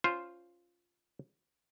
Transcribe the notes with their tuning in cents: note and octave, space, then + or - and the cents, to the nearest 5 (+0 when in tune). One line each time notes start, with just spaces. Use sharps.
C#4 +15 F4 +0 C5 +0